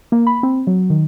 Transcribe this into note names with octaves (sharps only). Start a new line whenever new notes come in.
A#3
B5
C4
F#3
D#3